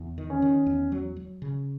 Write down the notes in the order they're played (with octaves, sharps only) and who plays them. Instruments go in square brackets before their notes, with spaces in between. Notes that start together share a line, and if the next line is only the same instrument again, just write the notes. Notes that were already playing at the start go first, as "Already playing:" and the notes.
Already playing: [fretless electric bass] E2
D#3
[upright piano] C#4
[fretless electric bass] D#3
E2
F#3
F#3
C#3